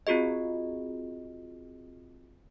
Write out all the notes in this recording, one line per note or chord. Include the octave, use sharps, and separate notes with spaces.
C4 F4 F#4 G#4 D#5